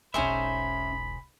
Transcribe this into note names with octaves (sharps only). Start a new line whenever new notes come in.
E1 B1 C#4 D#4 G#4 C5 E5 B5